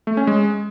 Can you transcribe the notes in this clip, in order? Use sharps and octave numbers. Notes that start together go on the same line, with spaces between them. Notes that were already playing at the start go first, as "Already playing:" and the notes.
A3
C#4
G#3